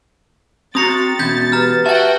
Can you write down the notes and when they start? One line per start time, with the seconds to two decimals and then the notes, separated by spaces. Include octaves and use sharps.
0.75 C4 F#4 A#5 C#6 D#6 A6 A#6 C#7
1.19 E2 B2 C#4 G6 G#6 B6
1.52 G4 B4 A#5 F6
1.86 F#4 E5 F#5 G5 A5 A6